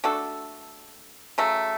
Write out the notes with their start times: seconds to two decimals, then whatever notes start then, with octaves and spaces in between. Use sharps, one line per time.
0.04 A3 D4 F#4 A4
1.38 C#3 F#3 A3